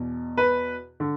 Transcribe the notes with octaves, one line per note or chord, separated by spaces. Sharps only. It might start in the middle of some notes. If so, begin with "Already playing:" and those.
Already playing: E2 B2
B4
D3